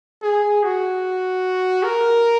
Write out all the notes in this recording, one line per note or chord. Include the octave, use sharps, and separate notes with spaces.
G#4
F#4
A#4